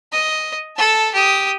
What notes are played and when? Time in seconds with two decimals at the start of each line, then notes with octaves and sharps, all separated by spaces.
0.12 D#5
0.76 A4 A5
1.14 G4 D#6